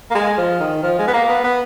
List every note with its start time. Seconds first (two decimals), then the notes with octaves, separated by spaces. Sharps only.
0.11 A#3
0.15 G#3
0.37 F3
0.60 D#3
0.83 F3
0.99 G#3
1.08 B3
1.13 A#3
1.29 B3
1.44 B3